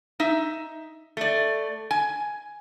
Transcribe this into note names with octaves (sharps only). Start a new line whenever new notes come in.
D#4 E5
A3 D5
G#5